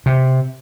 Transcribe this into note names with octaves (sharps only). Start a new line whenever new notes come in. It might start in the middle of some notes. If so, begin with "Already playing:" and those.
C3